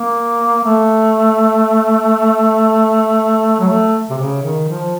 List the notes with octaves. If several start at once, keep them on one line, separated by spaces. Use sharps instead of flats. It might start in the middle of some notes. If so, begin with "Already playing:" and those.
Already playing: A#3
A3
F#3
A3
C3
C#3
D#3
F3